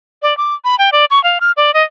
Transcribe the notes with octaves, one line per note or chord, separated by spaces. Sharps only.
D5
D6
B5
G5
D5
C#6
F5
F6
D5
D#5